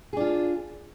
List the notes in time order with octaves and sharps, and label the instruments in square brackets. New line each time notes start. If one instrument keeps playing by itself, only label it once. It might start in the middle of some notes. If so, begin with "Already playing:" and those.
[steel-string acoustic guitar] G#4
D4
F4